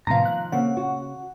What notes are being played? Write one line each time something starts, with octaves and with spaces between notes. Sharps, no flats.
A2 C3 D#3 F3 B3 F5 A#5
F#6
C#3 A#3 C4 F#5
F#4